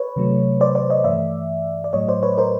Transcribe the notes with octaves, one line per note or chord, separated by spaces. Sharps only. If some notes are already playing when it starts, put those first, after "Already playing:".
Already playing: B4 C#5
C3 D#3 F#3 A3
C5 D5
C5 D5
C#5 D#5
G2 E3 A3 D5 E5
D5
A2 F#3 A3 C#5 D#5
C5 D5
B4 C#5
A#4 C5